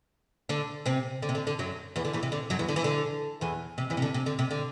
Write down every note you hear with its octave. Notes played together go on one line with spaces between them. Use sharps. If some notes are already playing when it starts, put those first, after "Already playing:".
D3 D4
C3 C4
D3
C3
D3
D3
F#2 F#3
E2 E3
D3
E2 E3
C3
D3
F#2 F#3
E2 E3
D3
E3
D3
E2 E3
C3
E2 E3
C3
D3
C3
D3
C3
D3